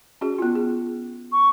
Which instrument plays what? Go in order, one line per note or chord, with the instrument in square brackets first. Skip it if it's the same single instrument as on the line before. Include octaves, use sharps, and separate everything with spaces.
[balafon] C#4 F#4 G#4
B3 F4
G#4
[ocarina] C#6